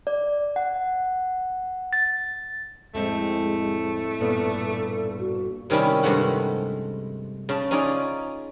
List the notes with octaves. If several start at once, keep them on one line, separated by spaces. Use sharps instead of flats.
D5
F#5
A6
F2 A2 G#3 A3 C4
G2 A#2 B3 A4
F#4
C3 D#3 G3 C#4 E4
G2 C3 G#3 A3 F#5
C#3 A5
C#4 D#4 F4 G#4 D5